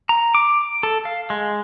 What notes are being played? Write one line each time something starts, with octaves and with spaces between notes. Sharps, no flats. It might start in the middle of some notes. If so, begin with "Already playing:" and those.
A#5
D6
A4
F5
G#3